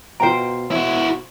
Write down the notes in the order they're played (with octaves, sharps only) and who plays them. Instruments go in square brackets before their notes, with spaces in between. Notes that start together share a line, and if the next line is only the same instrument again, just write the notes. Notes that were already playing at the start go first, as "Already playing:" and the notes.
[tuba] B2 [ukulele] F4 G5 A#5 [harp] C5 D7
[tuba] B2 [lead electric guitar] E4 F#4